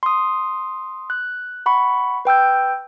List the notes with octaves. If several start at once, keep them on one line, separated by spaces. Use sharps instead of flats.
C6 D#6
F#6
F#5 B5 C#6
B4 G5 E6 G6